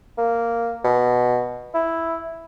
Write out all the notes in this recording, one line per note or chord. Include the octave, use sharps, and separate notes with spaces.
A#3
B2
E4